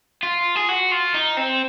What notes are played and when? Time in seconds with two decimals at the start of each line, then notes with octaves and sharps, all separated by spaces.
0.23 F4
0.56 G#4
0.69 F#4
0.91 F4
1.14 D#4
1.37 C4